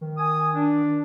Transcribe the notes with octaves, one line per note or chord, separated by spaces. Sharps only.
D#3
G#5 D#6
D4